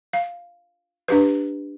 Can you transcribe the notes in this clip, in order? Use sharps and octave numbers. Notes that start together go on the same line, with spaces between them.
F5
D4 G4 B4